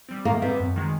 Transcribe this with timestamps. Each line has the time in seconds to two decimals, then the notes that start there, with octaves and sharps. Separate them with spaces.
0.09 G3 C4
0.25 D#3 A#3
0.42 G3 B3 C4
0.60 F#2
0.76 D#3 G#3